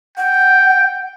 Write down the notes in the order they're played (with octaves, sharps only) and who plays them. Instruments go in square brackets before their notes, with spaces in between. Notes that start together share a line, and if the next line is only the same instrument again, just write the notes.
[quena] F#5 [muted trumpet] G5